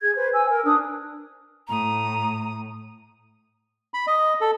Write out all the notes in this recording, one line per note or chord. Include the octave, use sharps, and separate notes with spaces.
G#4 G#6
B4 C5
G#5 E6
A#4
D4 D#6 F#6
A2 A#5 D#6
B5
D#5
A4